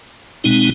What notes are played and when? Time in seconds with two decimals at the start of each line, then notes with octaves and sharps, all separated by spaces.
0.44 B2 G#3 C4 D#4